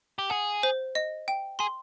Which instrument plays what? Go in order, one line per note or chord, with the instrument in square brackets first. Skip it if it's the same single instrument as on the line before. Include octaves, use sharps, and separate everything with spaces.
[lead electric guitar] G4
[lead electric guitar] G#4 [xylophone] F#5
[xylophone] C5
D#5
G5
[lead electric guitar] G#4 [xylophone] C6